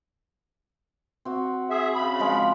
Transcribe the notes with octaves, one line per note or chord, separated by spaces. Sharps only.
C4 F#4
G#4 E5
C#3 B5
F3 G#3 F4